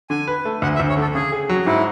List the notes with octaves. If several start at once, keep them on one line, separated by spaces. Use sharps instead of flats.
D3 G#5
B4
A3
D2 F#5
E5
D2
C#5
D3 A4
C#3 G#4
G#4
F#3
G#2 E4